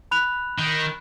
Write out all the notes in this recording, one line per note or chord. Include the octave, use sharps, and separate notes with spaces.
B5 F#6 F7
D#3